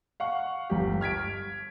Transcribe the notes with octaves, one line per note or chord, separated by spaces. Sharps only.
F5 F#5 C#6
G1 G4
F6 G#6 B6 D7